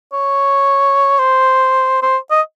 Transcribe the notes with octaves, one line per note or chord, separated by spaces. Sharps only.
C#5
C5
C5
D#5